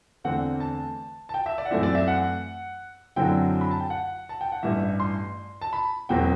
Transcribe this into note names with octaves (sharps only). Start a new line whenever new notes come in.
E2 D3 A3 C4 F#5
A5
A5
G5
E5
D5
F#5
F#2 E3 A3 C4 E4 E5
D5
E5
F#5
F#2 D3 F#3 C4 E4 G5
B5
A5
G5
F#5
A5
G5
F#5
A1 G2 E3 E5
C6
A5
B5
E1 E2 B2 F#3 C4 G5